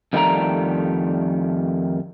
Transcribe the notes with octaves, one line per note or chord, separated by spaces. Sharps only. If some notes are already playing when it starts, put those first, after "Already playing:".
F2 D#3 G3 A3 D5 A#5